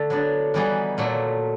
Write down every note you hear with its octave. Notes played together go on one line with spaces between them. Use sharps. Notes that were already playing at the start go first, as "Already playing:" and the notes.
Already playing: D3 A3
F#3 B3 D4
E3 G3 B3 D#4 G#4
A#2 F#3 A3